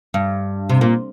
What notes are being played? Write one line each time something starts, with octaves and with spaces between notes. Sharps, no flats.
G2
C3
A#2